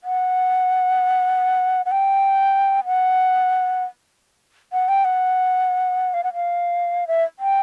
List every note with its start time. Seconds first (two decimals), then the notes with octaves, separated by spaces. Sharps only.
0.04 F#5
1.86 F#5
1.91 G5
2.85 F#5
4.73 F#5
4.88 G5
5.04 F#5
6.14 F5
6.24 F#5
6.34 F5
7.07 E5
7.39 G5